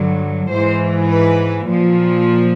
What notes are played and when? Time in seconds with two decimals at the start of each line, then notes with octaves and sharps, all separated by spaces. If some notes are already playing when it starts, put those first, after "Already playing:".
Already playing: G2 D3 F#3
0.49 G#2 E3 C5
1.07 B4
1.66 A#2 F3